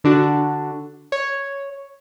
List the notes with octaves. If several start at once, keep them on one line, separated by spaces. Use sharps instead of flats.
D3 D4 F#4
C#5